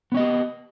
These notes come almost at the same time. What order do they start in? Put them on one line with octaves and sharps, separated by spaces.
B3 C#4 D#5 G4